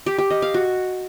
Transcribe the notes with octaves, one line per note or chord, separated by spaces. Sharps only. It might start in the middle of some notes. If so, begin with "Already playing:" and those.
G4
G4
D#5
F5
F#4